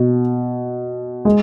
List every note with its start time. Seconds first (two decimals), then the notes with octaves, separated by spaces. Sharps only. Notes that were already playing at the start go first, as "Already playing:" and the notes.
Already playing: B2
1.25 G#3